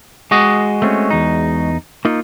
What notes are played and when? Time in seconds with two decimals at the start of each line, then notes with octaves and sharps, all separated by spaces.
0.31 G#3 F#4 D#5
0.82 A3 C4 C#4
1.10 E2 D#4
2.05 A#3 D#4 F4